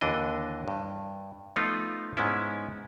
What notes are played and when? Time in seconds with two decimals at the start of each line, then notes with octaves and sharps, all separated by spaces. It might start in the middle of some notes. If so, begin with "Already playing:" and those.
0.01 D#2 D3 E3 D4 D#5
0.68 G2
1.56 F3 A3 B3 D#4 F4
2.17 G#2 G#3 B3 C#4 E4